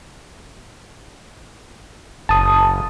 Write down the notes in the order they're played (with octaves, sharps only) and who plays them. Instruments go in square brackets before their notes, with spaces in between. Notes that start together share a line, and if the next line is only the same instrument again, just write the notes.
[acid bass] F#1 [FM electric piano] A5 D#6